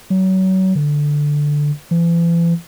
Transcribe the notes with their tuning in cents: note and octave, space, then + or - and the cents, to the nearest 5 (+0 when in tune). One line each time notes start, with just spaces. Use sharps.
F#3 +30
D3 +0
E3 +40